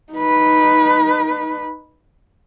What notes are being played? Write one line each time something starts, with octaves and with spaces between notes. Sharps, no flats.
D#4 B4